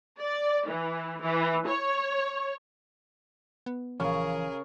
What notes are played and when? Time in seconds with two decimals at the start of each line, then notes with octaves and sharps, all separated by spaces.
0.20 D5
0.68 E3
1.21 E3
1.67 C#5
3.66 B3
4.00 A#1 C#3 E3 F3 G#4 A#4 C#5 F5